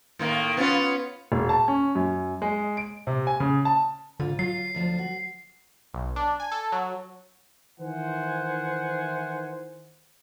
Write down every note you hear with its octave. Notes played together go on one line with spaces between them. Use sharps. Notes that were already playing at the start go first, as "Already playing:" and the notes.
A2 D#3 A#3
B3 C#4 F4
E1
A5
C#4
F#2
G#3
D7
C3
G#5
C#3
A5
G#2 D3 F4
F#3 F4 C7
D2 F3 C5
F#4
B1
D4
G#5
A4
F#3
D#3 E3 E4 C5 F#5 G#5